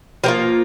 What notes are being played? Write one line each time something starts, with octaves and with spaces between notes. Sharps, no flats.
F3 A#3 F4 G4